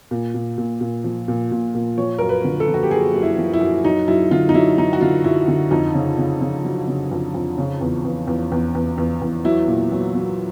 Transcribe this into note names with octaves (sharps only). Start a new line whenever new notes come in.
A#2
A#2
A#2
A#2
F3
A#2
A#2
A#2
F3 C#5
F#2 A#4
B4
D3
A4
F3
F#4
G4
F#2 G#4
F#2
E4
F3
E4
F#2
F#3 D#4
F#2 E4
D3 F4
D#4
F#3 E4
F#3 D#4
F#4
D3 F4
F#2 E4
D3
F2 D#4
C#3
C#3
C#3
F#3
C#3
F2
F2
C#3
E2
E2
E2
E2
E2
E2
E2
F#3 E4
A#2
F#3
F#3